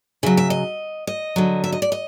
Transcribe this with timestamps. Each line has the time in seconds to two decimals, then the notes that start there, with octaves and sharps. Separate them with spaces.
0.23 C#3 F#3 E5
0.37 E5
0.50 D#5
1.07 D#5
1.36 D3 F#3
1.64 E5
1.72 D#5
1.82 D5
1.92 D#5